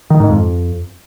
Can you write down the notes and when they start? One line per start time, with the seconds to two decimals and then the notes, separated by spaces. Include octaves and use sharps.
0.10 D#3
0.20 G#2
0.29 F2